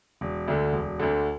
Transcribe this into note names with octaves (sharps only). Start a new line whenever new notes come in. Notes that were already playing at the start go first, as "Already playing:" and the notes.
E1
D2 D3
E1
D2 D3